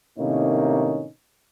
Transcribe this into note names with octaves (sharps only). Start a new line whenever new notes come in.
A2 C3 D#3 A#3 C#4 D#4